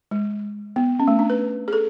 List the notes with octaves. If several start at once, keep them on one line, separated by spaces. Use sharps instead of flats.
G#3
B3
C#4
A3
D4
B4
G#4
A4